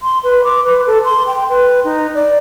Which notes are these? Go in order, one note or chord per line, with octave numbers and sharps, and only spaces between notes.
C6
B4
D6
B4
A4
C6
G5
B4
D#4
D5